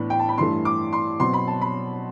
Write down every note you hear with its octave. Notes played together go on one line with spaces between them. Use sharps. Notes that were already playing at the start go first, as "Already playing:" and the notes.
Already playing: A2 E3 B3 D4 B5
G5
A5
B5
G2 E3 A3 C6
D6
C6
B2 F#3 C4 C6
B5
A5
B5